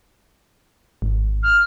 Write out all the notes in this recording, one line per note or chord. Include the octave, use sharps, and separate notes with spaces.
G#1
F6